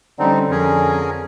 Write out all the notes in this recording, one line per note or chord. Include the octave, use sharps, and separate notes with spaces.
D3 G3 C4 C#4 D#4
F2 C#4 G#4 A#4